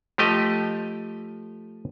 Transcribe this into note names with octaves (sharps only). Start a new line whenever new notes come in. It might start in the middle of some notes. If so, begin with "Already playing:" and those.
F3 A3 G4 D#5